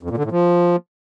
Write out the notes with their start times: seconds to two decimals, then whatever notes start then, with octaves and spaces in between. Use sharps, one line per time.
0.03 F2
0.10 A#2
0.17 D3
0.24 A2
0.32 F3